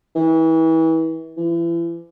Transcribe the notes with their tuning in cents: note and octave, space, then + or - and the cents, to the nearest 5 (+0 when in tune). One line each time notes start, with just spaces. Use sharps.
E3 -30
E3 +35